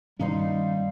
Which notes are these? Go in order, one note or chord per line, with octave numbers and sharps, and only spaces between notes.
G2 D#3 G3 A#3 C#4 D#4 C6